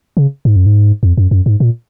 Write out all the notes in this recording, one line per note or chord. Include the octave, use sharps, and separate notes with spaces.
C#3
G#2
F#2
G#2
F2
F#2
F#2
G#2
A#2